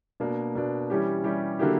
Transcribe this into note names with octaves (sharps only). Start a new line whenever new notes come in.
B2 A#3 D4
B2 A#3 D4
E3 G3 C#4 G4
E3 G3 C#4 G4
D3 F#3 A#3 E4 G4